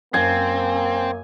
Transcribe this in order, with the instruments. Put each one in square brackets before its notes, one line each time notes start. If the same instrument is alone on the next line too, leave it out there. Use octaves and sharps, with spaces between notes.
[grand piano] F#2 [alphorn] A#3 [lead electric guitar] C4 [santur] G#5